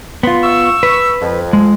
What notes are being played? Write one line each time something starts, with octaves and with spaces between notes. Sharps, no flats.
B3 F4 C6
C#6 E6
B4
F2
G#3